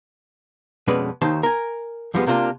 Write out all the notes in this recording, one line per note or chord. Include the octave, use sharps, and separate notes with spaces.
F2 B2 G#3 C#4 B4 D5
D#2 D#3 D#4 C5 C#5 A5
A#4 G#5
F2 F3 G3 G#3 B3
C3 A#3 D4 E4 F4